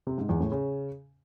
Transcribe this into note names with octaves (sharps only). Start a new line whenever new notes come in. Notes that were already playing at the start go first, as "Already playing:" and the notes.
C3
G#2
E2
A2
C#3